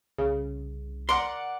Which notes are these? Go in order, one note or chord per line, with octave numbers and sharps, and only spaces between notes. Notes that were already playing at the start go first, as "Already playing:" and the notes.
C2 C#3
A#4 D5 F#5 C6